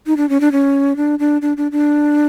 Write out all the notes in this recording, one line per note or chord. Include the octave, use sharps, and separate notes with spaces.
D#4
D4
C#4
D4
C#4
D4
D4
D4
D4
D4